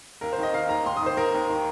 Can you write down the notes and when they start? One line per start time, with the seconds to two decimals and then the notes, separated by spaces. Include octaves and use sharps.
0.21 D#2 A#4
0.33 C5
0.38 D#3
0.43 D#5
0.54 D#3 F5
0.69 D#2 A#5
0.85 D#2 C6
0.96 D#6
1.02 D#3 C5
1.17 D#3 A#4
1.34 D#2
1.49 D#3